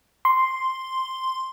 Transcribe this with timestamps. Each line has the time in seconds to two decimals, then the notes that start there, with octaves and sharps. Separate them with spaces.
0.25 C6